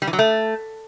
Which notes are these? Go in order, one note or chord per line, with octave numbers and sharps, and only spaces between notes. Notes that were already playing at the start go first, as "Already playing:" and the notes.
G3
E3
F#3
A3